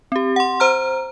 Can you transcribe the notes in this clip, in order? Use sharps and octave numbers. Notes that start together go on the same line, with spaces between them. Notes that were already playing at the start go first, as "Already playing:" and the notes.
C4 G4
F#5 C6
C5 A#5 F6